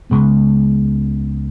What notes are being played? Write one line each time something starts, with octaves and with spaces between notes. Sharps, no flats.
C#2 C#3 G#3 B3